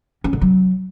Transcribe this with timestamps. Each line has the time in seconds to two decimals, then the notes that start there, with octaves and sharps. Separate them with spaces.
0.24 C#4
0.33 D3
0.41 F#3